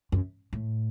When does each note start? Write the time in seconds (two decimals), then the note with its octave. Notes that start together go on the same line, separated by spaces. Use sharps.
0.12 F#2
0.53 A2